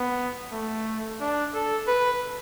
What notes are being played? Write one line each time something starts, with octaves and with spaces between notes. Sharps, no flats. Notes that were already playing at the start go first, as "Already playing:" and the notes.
Already playing: B3
A3
D4
A4
B4